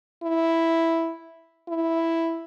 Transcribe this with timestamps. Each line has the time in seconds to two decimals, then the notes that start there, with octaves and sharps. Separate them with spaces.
0.23 E4
1.69 E4